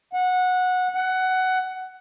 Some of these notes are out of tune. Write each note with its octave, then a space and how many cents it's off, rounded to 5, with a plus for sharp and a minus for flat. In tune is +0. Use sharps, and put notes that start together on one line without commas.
F#5 -15
F#5 +15